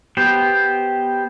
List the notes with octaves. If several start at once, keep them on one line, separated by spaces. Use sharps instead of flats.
B3 G4 C5